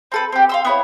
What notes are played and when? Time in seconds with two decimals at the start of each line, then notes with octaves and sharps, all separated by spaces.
0.12 C4 A4 B4
0.32 C4 G4
0.49 F5 C6 E6
0.65 B3 E4 C#5